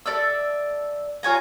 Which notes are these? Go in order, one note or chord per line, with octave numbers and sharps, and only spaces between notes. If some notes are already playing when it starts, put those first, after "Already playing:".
A4 D5 E5 E6
F4 C#5 G#5 A#5